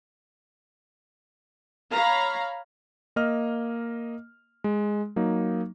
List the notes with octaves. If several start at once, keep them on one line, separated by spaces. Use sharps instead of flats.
C#5 F5 A#5 B5
A#3 D#5 F6
G#3
F#3 A#3 D#4